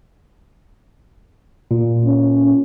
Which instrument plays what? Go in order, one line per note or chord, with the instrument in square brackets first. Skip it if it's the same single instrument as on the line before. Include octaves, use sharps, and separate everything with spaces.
[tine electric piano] A#2
[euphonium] C#4